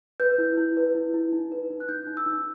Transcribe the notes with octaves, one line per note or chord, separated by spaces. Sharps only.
B4 G6
E4
E4
B4
E4
E4
D#4
B4
D#4
F#6
D#4 G6
D#4
E6
D#4